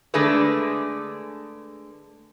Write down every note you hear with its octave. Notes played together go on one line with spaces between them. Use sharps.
D3 G#3 A3 D4 G#4 B4